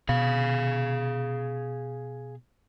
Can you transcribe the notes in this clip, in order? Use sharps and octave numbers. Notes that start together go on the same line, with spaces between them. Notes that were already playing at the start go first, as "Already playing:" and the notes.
B2 G#4 F5